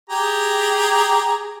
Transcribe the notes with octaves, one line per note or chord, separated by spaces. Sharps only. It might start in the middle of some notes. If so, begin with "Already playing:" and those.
G4 G#4 A#5